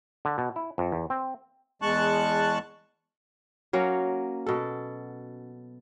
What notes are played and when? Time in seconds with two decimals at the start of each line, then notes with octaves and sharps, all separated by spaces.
0.25 D3
0.38 B2
0.56 E4
0.78 F2
0.92 E2
1.10 C4
1.82 E2 G#3 A5 C#6 F#6
3.73 F#3 A#3 C#4
4.46 B2 A4